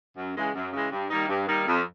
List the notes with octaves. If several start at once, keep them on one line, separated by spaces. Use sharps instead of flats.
F#2
C#3 E3 G#3
F#2
C#3 E3 G#3
G2
D#3 G3 A#3 D#4
G2
D#3 G3 A#3 D#4
F2